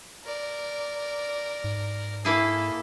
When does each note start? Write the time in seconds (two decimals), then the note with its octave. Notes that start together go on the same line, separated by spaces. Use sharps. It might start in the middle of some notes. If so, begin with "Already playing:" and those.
0.24 A#4 D5
1.64 G#2
2.25 A#3 E4 G#4 A4